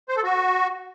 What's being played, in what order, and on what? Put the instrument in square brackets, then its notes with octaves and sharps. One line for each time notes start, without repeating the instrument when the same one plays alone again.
[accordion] C5
A4
F#4